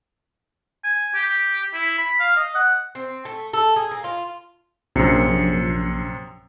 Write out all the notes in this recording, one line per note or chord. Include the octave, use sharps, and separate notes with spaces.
G#5
G4
E4
B5
F5
D#5
F#5
C4
A3
A4
G#4
A#3
F4
A#1 F#2 C3 C7 C#7